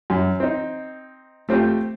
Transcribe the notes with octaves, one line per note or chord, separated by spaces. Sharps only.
F#2
C4 D#4
A3 C4 F4 G4